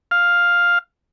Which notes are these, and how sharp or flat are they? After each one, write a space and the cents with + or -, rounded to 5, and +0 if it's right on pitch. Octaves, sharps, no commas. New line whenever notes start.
F5 +5